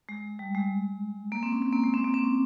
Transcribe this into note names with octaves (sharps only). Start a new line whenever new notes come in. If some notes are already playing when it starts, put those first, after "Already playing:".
G#3
G3
G#3
A#3
C4
C#4
C4
A#3
G#3
C4
A#3
C4
C#4